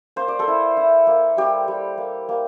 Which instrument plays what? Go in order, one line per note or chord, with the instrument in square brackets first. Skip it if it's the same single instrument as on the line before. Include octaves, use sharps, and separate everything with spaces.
[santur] A#3 C5
D5
A4 C5
E4
E4
A#3
G3 G4
G3
A#3
A#3